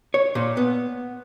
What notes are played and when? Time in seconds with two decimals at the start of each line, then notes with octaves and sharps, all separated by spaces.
0.14 C#5
0.35 A#2
0.57 B3